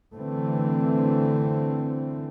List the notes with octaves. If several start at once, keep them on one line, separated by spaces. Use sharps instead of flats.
D3 E3 A3 C4